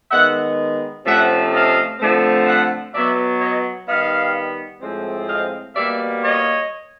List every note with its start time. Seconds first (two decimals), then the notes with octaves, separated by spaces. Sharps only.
0.11 D#3 G#3 B3 E5 F#5
1.05 C3 F3 A3 C#4 E5 F#5
1.53 D#5 F5
1.99 D3 F3 A3 C4
2.46 E5 F#5
2.93 B2 F#3 B3 D5 E5
3.40 C#5 D#5
3.87 D#3 G3 B3 D#5 F5
4.82 A2 F3 G#3 C4
5.28 D#5 F5
5.75 B2 G3 A#3 D5 E5
6.22 C#5 D#5